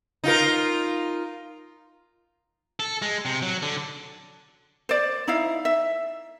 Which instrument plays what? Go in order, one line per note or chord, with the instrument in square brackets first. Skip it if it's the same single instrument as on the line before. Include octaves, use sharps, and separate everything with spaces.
[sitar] D#4 F4 A#4
[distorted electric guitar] A4
G#3
C3
F#3
D3
[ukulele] C5 D5
D#4 E4 F5
E5